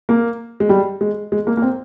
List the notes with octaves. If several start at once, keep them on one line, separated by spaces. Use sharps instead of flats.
A#3
G#3
G3
G#3
G#3
A#3
A#3
C4